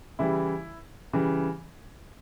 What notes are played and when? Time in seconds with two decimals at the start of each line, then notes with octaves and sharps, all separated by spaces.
0.19 C#3 E3 G3 E4
1.13 C#3 E3 G3